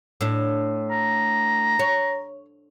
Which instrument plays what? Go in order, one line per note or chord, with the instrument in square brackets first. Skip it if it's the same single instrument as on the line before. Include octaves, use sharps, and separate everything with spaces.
[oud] A2 D4
[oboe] A#5
[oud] C#5